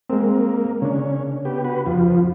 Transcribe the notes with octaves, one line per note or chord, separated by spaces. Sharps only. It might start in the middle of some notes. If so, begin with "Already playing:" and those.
G#3 A#3 C4
C#3 C#4 D4
B3 G4
F#4 B4
F2 F3